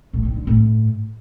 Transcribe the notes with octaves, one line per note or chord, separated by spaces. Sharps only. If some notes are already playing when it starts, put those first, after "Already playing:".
A2
D#3
D3
A2